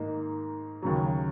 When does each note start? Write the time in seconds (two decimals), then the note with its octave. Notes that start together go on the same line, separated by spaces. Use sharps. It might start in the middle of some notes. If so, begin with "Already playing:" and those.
Already playing: G#2 D#3 A#3 D#4
0.82 D#2 C#3 F#3